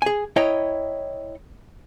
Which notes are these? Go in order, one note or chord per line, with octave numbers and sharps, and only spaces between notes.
G#4 G#5
E4 C#5 D#5 G5 A#5